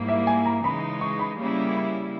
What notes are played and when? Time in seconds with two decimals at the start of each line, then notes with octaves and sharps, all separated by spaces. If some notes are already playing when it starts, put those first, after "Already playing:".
Already playing: G#2 G3 A#3 E4
0.09 E5
0.27 G#5
0.46 A#5
0.64 C#3 E3 G#3 D#4 B5
1.01 C#6
1.19 B5
1.38 C#3 G3 A#3 C#4 E4
1.75 B5